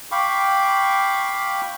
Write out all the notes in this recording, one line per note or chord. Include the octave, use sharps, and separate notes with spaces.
F5 G5 B5 C#6 D6